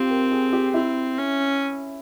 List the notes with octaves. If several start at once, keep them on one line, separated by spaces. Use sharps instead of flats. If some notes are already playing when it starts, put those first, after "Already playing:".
Already playing: C4 F4 G4
A#4
G#4
G4
C4 E4
C#4